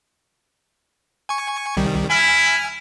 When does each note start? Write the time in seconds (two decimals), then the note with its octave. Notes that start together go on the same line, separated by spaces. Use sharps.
1.29 G#5 C#6
1.77 C2 D#3 G3
2.10 E4 G#5 F6